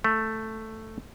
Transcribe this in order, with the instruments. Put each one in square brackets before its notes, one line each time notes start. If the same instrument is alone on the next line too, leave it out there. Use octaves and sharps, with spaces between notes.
[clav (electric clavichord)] A3